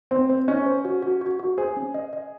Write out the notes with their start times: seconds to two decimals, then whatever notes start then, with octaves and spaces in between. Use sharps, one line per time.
0.11 C4 C5
0.30 C5
0.48 C#4 D#5
0.66 C5
0.85 F#4
1.02 F#4
1.21 F#4
1.39 F#4
1.58 G#4 C5
1.77 C#4
1.94 D#5
2.13 D#5